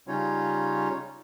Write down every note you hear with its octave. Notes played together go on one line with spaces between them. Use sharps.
C#3 G3 C#4 D#4 F4 C#5